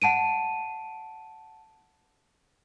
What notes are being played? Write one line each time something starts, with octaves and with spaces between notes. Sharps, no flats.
F#5 A5 D7 D#7